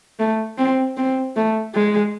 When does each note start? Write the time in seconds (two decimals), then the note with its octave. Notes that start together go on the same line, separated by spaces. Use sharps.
0.19 A3
0.58 C4
0.97 C4
1.36 A3
1.75 G#3